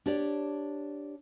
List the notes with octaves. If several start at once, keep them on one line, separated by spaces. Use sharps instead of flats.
D4 G4 C#5 D5